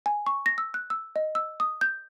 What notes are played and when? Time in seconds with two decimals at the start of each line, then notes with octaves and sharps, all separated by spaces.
0.06 G#5
0.26 C#6
0.46 A#6
0.58 E6
0.74 F#6
0.90 E6
1.16 D#5
1.35 E6
1.60 D#6
1.81 G6